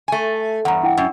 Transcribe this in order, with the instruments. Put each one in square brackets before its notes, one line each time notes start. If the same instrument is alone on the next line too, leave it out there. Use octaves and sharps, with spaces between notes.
[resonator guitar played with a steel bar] A3 G#5
[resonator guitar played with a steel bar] E2 G2 [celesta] F#5 A#5
[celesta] E4 F#5 G5
[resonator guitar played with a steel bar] F#2